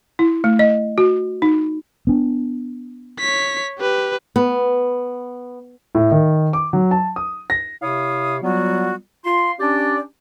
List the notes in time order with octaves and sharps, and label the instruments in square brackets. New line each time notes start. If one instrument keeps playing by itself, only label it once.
[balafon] E4
A3
D#5
F#4
D#4
[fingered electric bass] B3 D4
[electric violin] C#5 B6
G4 B4
[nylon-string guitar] B3
[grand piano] A2
D#3
D6
F#3
A5
D#6
A#6
[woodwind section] C3 E4 C#5 F5 D#6
F#3 G3 B3 F4 F#4
F4 C6
C#4 D4 G4 D5